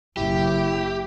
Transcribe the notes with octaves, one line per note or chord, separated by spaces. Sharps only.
F#1 E4 G4